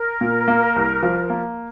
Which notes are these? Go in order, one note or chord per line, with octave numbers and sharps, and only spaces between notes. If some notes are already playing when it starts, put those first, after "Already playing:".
Already playing: A#4
A#2
A#3
C2
F3
A#3